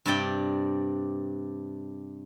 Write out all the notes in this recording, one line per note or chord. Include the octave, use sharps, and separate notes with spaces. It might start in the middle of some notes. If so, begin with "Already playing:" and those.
G2 C3 D4 D5 G5